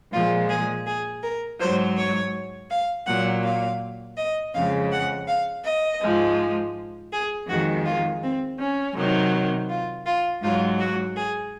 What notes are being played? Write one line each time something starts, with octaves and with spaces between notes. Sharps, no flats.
A#2 F3 G#3 F4
G#4
G#4
A#4
G#2 F#3 C5
C#5
F5
A#2 F#3 F#5
F5
D#5
F2 C#3 G#3 F5
F#5
F5
D#5
G#2 F3 G#3
G#4
F2 D#3 G#3 F#4
F4
C4
C#4
C3 D#3 F#3
F4
F4
G#2 F#3 F4
F#4
G#4